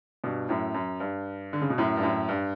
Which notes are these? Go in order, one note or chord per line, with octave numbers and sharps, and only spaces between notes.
G2 B2
F#2 A2
F#2
G2
D3
C#3
B2
F#2 A2
G2
F#2 A2
G2